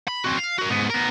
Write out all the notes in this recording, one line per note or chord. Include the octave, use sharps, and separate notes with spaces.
B5
C4 F#4
F5
F#4 A#4
G#2 B3
B3 A#4